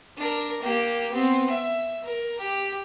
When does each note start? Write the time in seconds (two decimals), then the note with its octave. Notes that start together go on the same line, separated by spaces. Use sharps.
0.18 D4 A#4
0.62 A#3 G4
1.11 B3 C4
1.50 E5
2.04 A#4
2.39 G4